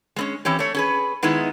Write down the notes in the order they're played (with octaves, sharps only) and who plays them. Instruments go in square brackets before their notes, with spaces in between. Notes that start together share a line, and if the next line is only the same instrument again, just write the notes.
[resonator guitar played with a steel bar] G#3 C4 C#4
E3 C4 C#4 G4
A3 C#5
C#4 G#4 B4
D#3 G#3 B3 D#4 E4